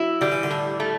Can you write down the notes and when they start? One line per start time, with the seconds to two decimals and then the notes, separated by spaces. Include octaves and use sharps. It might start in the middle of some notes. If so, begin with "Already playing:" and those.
Already playing: F#3 E4
0.21 D3 G3
0.32 E3
0.43 D3
0.51 A2
0.80 A3